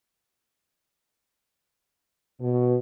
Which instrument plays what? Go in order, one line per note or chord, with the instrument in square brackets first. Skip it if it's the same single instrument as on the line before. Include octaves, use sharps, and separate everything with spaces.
[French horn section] B2